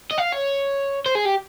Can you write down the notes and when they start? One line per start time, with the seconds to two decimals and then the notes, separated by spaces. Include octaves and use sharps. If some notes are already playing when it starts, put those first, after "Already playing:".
0.11 D#5
0.18 F5
0.32 C#5
1.06 C5
1.15 G#4
1.25 G4